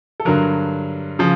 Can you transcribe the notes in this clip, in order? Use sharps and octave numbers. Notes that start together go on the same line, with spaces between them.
A4
G2 D3 F#3 A#4
C#3 F3